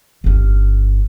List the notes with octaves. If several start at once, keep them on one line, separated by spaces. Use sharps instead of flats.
G1 C#4